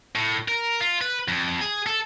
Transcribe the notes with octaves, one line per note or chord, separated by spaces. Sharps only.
A2
A#4
F4
B4
F2
G#4
A4